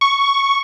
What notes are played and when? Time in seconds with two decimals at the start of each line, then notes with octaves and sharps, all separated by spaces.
0.01 C#6